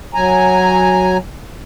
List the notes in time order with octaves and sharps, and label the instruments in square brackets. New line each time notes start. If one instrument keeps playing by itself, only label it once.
[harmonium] F#3 G#5 A#5